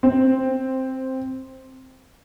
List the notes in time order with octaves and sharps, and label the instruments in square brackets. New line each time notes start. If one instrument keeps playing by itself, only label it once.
[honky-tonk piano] C4